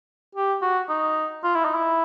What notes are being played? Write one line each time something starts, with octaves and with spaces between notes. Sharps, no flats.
G4
F#4
D#4
F4
E4
D#4
E4